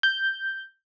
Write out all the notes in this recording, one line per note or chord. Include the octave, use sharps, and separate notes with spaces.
G6